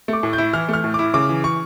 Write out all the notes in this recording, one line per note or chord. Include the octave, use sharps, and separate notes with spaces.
A3
D6
A2
G6
E4
E3 F6
A3 F6
A2
E4 D6
C#3 D6
E3
C#6